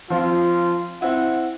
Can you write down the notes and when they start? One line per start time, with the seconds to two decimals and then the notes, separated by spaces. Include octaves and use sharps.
0.10 F3 C4 F4
1.02 C4 E4 F#5